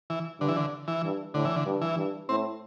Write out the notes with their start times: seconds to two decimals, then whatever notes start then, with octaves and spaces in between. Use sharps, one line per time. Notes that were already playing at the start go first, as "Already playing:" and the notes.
0.10 E3
0.40 G2 D3
0.48 E3
0.57 D3
0.88 E3
1.04 G2
1.34 A2 D3
1.45 E3
1.56 D3
1.66 G2
1.81 E3
1.98 G2
2.29 A2 C4